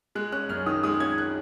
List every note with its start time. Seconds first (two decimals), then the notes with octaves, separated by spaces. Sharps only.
0.15 G#3 F#6
0.32 C#4 F#6
0.49 F#2 F6
0.66 D#3 D#6
0.84 G#3 D#6
1.00 C#4 G#6
1.18 F#6